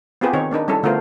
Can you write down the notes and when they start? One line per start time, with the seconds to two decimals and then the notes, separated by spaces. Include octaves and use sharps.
0.21 B3 C4 F4 G4 G#4 B4
0.33 D#3 C4 D#4 C#5
0.51 A#3 D4 D#4 B4
0.68 G3 C#4 E4 A4
0.83 D3 A3 B3 F4 A#4 C5